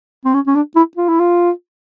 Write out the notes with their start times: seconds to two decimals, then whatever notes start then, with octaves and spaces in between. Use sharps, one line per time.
0.25 C4
0.34 C#4
0.47 C#4
0.55 D4
0.76 E4
0.97 F4
1.09 E4
1.20 F4